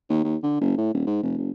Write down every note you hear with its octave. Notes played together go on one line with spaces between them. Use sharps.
D#2
D#2
D3
F#1
A2
D#1
G#2
F1
F#1